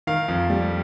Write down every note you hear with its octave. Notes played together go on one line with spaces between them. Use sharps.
D#3 F5
F2
G3